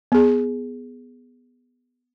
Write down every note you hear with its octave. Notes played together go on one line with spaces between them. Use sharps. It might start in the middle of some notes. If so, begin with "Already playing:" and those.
B3 G#4